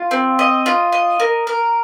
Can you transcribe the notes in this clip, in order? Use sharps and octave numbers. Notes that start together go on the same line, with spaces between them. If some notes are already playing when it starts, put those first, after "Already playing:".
Already playing: F4
C4
D#5
F4
D#5
A#4
A#4